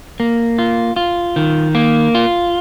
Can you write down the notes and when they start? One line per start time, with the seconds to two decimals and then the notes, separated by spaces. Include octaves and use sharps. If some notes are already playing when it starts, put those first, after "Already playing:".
0.20 A#3
0.59 F4
0.96 F4
1.36 D#3
1.75 A#3
2.15 F4